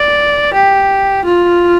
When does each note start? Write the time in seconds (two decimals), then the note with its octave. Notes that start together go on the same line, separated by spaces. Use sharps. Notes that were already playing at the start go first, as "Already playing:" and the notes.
Already playing: D5
0.54 G4
1.25 F4